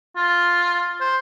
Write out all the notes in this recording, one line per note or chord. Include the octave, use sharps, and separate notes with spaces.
F4
C5